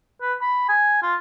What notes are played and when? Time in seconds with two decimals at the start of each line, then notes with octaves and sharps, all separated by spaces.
0.21 B4
0.41 B5
0.69 G#5
1.03 F4